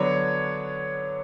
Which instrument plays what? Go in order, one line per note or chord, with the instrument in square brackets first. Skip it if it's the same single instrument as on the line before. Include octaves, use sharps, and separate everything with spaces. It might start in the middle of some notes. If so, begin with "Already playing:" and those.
Already playing: [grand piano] D3 F#3 B3 D4 [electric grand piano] C#5